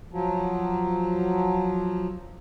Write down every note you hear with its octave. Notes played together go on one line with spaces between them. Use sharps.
F3 F#3